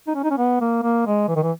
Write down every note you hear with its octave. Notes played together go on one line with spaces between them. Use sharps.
D#4
C#4
D#4
C#4
B3
A#3
A#3
G#3
E3
D#3
E3